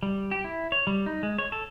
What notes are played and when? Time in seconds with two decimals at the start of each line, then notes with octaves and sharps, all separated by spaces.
0.03 G3
0.31 G4
0.44 E4
0.72 C#5
0.87 G3
1.06 D#4
1.23 G#3
1.38 C#5
1.52 A4